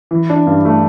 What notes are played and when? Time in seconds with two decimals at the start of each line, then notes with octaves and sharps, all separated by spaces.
0.11 E3
0.30 D4
0.47 G2
0.65 A3